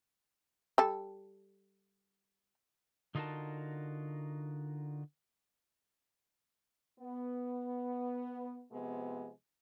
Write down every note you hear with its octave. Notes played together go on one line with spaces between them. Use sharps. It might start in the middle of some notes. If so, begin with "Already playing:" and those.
G3 A4
D3 D#4 F4 F#4 A#4 A5
B3
C3 F3 G#3 B3